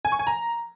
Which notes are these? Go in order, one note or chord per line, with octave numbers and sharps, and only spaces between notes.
G#5
C#6
G#5
A#5